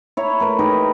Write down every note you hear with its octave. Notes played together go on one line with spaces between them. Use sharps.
E4 C#5 A#5
A3 A#4 B4
D#4 G4 A#4 B4